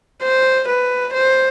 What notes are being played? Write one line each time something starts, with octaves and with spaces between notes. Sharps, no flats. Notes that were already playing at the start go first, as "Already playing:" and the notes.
C5
B4
C5